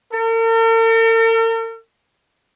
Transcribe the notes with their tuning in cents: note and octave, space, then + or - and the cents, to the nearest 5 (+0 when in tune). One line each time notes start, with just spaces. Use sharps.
A#4 -45